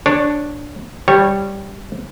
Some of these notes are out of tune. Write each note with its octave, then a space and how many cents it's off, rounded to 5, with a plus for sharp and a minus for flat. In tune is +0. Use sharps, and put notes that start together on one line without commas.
D4 +0 C#5 -10
G3 +0 C#5 -15